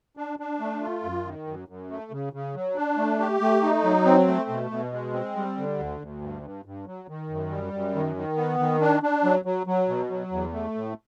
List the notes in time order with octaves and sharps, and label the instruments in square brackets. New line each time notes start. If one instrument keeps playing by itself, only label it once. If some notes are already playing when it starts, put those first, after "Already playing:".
[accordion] D4
D4
A3
F4
F#2
D#3
F#2
F#2
A3
C#3
C#3
F#3
D4
A3
G4
A3
D#4
F#3
C4
A3
B2
B2
G#3
C4
G3
D3
D2
D2
G2
G2
G2
F#3
D#3
F#2
G3
F#2
D#3
D#3
B3
D#3
D4
D4
F#3
F#3
F#3
B2
F#3
E2
A3
A2